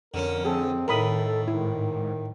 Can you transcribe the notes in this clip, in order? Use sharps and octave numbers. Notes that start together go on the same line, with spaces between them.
F2 D3 C#4 A#4
C4 G#4 A4
A2 D#3 A4 A#4 B5 D#6
A4
G#2 D#3 E4